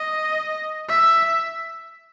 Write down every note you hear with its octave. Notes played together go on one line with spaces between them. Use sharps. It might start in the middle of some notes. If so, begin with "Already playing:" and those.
Already playing: D#5
E5